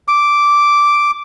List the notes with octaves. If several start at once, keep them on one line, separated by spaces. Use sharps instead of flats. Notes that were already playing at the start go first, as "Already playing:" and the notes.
D6